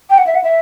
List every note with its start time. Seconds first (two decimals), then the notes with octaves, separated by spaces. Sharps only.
0.10 G5
0.18 F#5
0.27 E5
0.35 F#5
0.44 E5